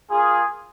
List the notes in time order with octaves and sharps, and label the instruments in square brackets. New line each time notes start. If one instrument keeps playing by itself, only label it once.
[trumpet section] A#3 F4 G#4